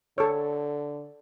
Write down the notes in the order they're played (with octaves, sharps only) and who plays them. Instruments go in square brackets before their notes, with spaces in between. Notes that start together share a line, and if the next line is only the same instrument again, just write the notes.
[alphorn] D3 [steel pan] A4 C#5